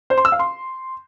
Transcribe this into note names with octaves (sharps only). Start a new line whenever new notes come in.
C5
C6
E6
F5
C6